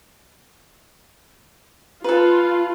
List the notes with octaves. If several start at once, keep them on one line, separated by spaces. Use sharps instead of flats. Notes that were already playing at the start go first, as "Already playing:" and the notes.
F4 A4 B4